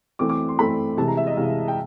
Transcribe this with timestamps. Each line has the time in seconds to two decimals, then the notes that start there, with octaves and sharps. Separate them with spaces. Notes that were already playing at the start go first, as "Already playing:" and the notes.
0.19 E3 A3 C4 D6
0.29 D6
0.49 C6
0.59 E3 A3 C4 B5
0.97 C3 E3 G#3 A5
1.08 A#5
1.17 E5
1.27 D#5
1.37 C3 E3 G#3 F5
1.68 G5